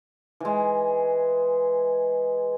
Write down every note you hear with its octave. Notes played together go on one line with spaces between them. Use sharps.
E3 G#3